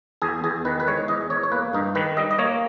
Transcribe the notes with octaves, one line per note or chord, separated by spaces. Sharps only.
E2 G#4
E2 G#4
D#3 B4
B4
G#3 C#5
E2 D#5
E2 C#5
C#5
A#3 B4
G2 D#4
D#3 B4
G3 D#5
D#5
A#3 C#5